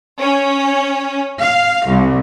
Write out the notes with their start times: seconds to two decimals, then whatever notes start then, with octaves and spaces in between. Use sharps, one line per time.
0.20 C#4
1.40 F5
1.87 C2